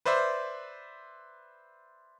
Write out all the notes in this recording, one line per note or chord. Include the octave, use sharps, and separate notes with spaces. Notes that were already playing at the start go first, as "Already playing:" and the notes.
B4 C5 D5 E5